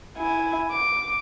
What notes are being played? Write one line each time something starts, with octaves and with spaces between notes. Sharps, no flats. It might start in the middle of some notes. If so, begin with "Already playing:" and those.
E4 G#5
D6